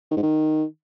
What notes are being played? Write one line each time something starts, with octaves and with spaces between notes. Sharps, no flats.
D#3
G#2
D#3